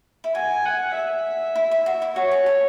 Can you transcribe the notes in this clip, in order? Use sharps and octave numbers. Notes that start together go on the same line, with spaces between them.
E4
F#4 G#5
F#5
E5
E4
E4
F#4
E4
F#4 C#5
G#4
A4